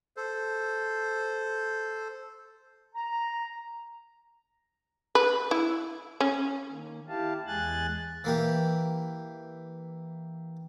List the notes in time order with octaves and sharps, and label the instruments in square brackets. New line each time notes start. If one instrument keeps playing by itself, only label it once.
[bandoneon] A4 C5
[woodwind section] A#5
[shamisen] B4
E4
C#4
[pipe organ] D#3 A#3
E4 G4 F5 A5
E2 G#3 G#4 G#5 F#6 A6
[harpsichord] E3 A#3 G4